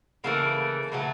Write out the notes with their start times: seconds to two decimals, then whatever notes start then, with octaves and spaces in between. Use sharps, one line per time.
0.24 C#3 E3 A3 A#3
0.92 C#3 F#3 A3